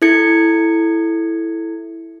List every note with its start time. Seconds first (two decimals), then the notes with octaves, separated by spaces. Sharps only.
0.02 E4 A4 G#6 C#7